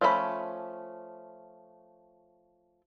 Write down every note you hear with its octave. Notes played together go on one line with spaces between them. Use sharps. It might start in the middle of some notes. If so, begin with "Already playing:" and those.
F3 A3 C#4 E4 B5